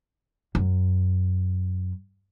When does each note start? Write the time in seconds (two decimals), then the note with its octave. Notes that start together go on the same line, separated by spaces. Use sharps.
0.55 F#2